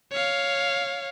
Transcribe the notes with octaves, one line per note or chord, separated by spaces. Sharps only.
C#5 F5